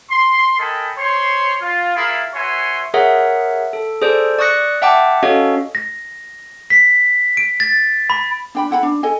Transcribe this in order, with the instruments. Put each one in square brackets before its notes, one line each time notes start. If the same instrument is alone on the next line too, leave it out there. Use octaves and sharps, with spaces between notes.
[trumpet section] C6
A4 A#4 D#5 G5 G#5 B5
C5 C#5 C6
F4
E4 F4 G#4 A#4 F5
F#4 B4 C#5 E5 G#5 C6
[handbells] G#4 A#4 C#5 E5 F#5
A4
G#4 A4 C5 D5
D5 C#6 D#6 F#6 A#6 C#7
E5 F#5 G5 A5 D6
C#4 F#4 A4 C#5 D#5 F5
[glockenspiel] A#6
B6
D7
A6
B5
[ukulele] D4 G5 B5
E4 F#5 G5 B5
D4
A4 D#5 G#5